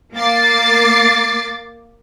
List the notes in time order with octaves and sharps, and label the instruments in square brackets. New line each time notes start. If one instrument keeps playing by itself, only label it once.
[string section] A#3 D6 A6 C7